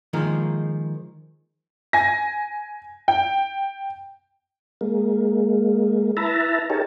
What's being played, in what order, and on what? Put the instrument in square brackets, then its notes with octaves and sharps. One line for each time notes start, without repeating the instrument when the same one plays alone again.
[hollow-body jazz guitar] D#3 F3 G#3 A#3
[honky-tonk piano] G#5 A#6
G5
[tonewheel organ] G#3 A#3
E4 B4 E5 A5 A#5
D#4 G4 G#4 A#4 C#5 A5